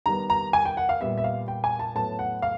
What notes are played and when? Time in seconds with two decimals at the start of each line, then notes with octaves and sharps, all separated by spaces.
0.06 D#3 G3 B3 A#5
0.30 A#5
0.53 G#5
0.65 G5
0.77 F#5
0.89 F5
1.01 A#2 G3 B3 E5
1.18 E5
1.24 F5
1.48 G5
1.64 G#5
1.79 A5
1.95 A2 F#3 B3 A5
2.19 F#5
2.42 F5